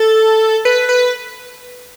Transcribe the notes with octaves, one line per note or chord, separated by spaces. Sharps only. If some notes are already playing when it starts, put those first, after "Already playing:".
Already playing: A4
B4
B4